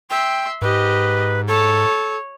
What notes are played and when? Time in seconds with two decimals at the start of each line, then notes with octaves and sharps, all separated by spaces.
0.10 E5 G5 C6
0.62 G#2 G4 B4 D#5
1.48 A4 C#5